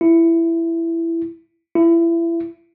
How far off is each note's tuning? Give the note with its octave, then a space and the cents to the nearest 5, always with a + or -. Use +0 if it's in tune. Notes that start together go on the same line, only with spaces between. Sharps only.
E4 +10
E4 +25